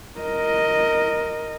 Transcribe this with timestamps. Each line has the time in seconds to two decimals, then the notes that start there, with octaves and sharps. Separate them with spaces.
0.20 A#4 D#5